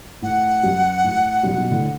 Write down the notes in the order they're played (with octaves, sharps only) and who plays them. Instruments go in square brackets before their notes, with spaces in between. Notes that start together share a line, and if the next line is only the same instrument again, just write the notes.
[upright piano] A2 [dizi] F#5
[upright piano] F#2
A2
F#2 B2
F#2 B2
A2 D3